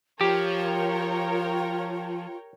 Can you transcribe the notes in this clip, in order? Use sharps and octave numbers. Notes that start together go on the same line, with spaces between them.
F3 F4 G4 A#4 C#5 G5